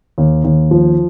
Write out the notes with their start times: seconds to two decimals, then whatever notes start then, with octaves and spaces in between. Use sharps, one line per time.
0.18 D#2
0.44 D#2
0.71 F3